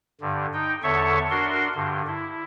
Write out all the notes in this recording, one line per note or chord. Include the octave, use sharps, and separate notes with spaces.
G2 D3
D#4 G5
E2 D3 A4 C#5 E5 C#6
D4 F#4 A#4 C6
G2 D3
E4